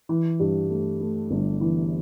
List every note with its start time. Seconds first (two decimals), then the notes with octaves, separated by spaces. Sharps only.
0.09 E3
0.40 G2
0.69 A3
1.01 A3
1.31 G1
1.61 E3